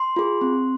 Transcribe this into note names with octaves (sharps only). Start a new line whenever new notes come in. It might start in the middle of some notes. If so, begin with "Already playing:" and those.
Already playing: C6
F4 G#4
C4